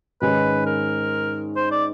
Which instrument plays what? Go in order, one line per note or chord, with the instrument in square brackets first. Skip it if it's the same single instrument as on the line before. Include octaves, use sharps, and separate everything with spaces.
[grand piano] G#2 D#3 G#3 C#4 [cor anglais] B4
[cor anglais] A#4
C5
D5